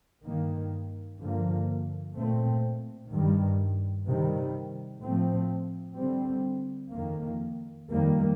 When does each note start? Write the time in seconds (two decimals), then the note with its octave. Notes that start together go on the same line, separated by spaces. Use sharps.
0.24 G2 D#3 A#3
1.20 G2 D3 F3 A#3
2.15 A#2 A3 C4
3.11 G2 D#3 G3
4.06 C3 D#3 G3
5.02 A2 F3 A3 C4
5.97 D3 G3 C4
6.93 F2 D#3 A#3
7.88 F2 D#3 G3 A#3